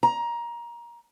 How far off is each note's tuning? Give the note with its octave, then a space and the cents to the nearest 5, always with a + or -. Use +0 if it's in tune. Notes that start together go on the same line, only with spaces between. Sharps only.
A#5 +20